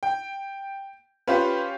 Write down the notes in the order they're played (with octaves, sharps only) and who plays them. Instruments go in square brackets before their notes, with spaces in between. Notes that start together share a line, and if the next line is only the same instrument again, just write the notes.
[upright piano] G5
[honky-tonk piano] C#4 F4 G4 [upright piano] B4 C5